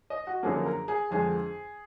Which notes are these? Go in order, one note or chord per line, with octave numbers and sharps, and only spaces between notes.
D#5
F#4
F#2 D3 F3 A#3 G#4
A#4
G#4
F2 D3 F3 G#3 G#4